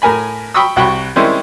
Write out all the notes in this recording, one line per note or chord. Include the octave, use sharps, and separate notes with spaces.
A2 A#4 G#5 B5
G5 B5 C#6 D#6 E6
C2 F#4 G5 B5 C#6
D#3 G3 G#3 C4 C#4 E4